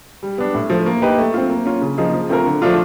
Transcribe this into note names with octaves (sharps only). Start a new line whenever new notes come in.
G3
B3 D4
A2
F3 A3
A#3
D#4 G4 B4
A3
C4 F4
A#3
C#4 F4
C#3
F3 A#3 D#4 G#4
F3
A3 C4 F4 A#4
D3
F3 A3 D4 F4